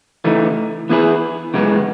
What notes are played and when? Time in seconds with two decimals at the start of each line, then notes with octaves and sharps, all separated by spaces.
0.24 C#3 E3 A3 D#4
0.89 E3 B3 E4 G#4 B4
1.54 F#2 C#3 E3 G#3 B3